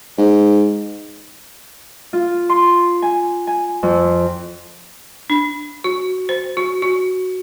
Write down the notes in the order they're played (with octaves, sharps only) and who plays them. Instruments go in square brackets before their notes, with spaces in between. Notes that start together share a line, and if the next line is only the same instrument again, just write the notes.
[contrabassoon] G#2
[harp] F4
C6
G#5
G#5
F2
[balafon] D4
F#4
C5
F#4
F#4